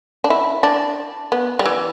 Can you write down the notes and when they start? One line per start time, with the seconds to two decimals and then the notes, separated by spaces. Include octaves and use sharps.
0.24 D4
0.30 E4
0.63 D4
1.32 B3
1.59 G3
1.66 E3